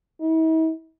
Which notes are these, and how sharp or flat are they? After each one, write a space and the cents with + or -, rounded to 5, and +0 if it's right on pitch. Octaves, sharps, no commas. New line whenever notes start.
E4 -45